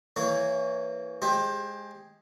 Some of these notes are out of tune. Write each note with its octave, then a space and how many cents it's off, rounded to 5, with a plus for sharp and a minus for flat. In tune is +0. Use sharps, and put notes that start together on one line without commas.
E3 +0 A#3 -30 C#5 +0
G#3 +0 G4 +15 C5 +25